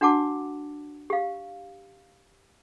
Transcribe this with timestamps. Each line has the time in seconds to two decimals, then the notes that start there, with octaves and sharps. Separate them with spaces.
0.01 D4 F#4 F#5 A5 D6
1.10 G4 F5